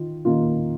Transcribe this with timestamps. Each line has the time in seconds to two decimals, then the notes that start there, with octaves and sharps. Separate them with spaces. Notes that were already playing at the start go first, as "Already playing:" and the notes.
Already playing: D#3 F4
0.25 D#3 A#3 F4